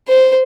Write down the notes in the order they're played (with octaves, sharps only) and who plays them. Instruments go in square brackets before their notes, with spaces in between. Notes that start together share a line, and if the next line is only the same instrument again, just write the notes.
[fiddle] C5